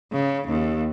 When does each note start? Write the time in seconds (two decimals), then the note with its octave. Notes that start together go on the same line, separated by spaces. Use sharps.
0.12 C#3
0.48 D#2